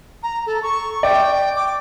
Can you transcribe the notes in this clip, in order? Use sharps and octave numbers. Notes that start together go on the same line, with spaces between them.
A#5
A4
C#6
D5 G5
D6